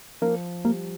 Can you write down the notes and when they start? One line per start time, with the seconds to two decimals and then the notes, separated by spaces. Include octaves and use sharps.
0.22 F3 A#3
0.65 G3 A#3